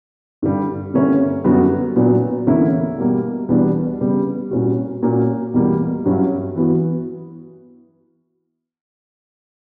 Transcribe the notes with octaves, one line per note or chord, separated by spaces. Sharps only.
G2 D3 G3
G2 D3 A#3 C#4 E4
F#2 D3 G3 B3 F#4
A#2 F#3 B3 D4 F#4
E2 D3 A#3 C#4 E4
B2 G3 A#3
E2 B2 G3 B3 D4
C#3 G3 B3
A#2 G3 C#4 F#4
A#2 A#3 C#4 F#4
E2 B2 G3 A#3
G2 F#3 C#4 E4
E3 B3 F#4